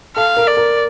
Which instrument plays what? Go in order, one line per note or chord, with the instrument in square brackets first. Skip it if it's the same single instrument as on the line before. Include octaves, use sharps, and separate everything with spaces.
[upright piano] A4 [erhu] F5
[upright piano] A#4
[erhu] D5
[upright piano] A#4